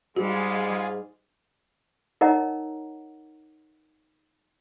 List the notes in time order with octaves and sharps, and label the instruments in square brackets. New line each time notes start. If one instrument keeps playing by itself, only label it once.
[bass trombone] G#2 [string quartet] G3 G#3 [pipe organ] F4 G#4 [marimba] F#4
[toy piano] D#4 A#4 C#5 D#5 F#5 A#5